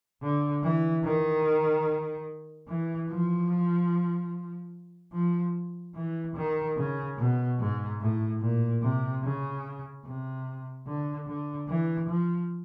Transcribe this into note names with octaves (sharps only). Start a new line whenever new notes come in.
D3
E3
D#3
E3
F3
F3
E3
D#3
C#3
B2
G#2
A2
A#2
C3
C#3
C3
D3
D3
E3
F3